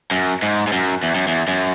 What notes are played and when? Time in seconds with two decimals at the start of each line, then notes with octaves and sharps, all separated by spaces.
0.11 F#2
0.42 G#2
0.67 G#2
0.73 F#2
1.03 E2
1.15 F#2
1.28 E2
1.48 F#2